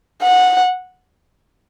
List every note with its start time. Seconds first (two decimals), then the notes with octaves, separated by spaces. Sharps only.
0.22 F#5